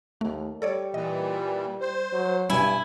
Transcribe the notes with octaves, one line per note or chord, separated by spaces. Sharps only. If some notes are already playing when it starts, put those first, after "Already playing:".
D#2 A3
G3 A4 C#5 D5
A#2 E3 D#5
C5
F#3
G2 B2 G3 E4 G#5